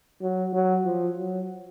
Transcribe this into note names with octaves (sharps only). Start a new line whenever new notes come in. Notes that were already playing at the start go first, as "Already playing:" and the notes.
F#3
F#3
F3
F#3